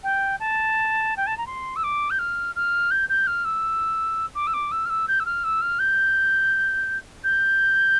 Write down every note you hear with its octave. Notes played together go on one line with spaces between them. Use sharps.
G5
A5
G5
A5
A#5
C6
E6
D6
G6
F6
F6
G6
G6
F6
E6
D6
E6
D6
E6
F6
E6
G6
E6
F6
E6
F6
G6
G6